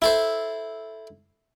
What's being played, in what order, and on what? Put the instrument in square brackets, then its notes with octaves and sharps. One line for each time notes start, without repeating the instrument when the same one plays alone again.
[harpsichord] E4 A4 C5